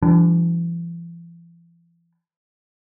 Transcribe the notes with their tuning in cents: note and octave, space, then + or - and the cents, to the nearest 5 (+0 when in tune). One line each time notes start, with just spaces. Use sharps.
E3 +45 G3 +0 D4 -5